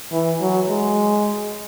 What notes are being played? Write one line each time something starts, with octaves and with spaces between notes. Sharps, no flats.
E3
F#3
G#3